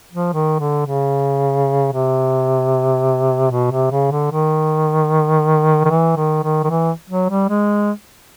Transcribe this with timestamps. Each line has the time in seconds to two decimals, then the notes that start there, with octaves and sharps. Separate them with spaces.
0.13 F3
0.33 D#3
0.60 D3
0.87 C#3
1.92 C3
3.51 B2
3.71 C3
3.91 C#3
4.11 D3
4.31 D#3
5.85 D#3
5.90 E3
6.16 D#3
6.43 D#3
6.64 D#3
6.70 E3
7.10 F#3
7.30 G3
7.49 G#3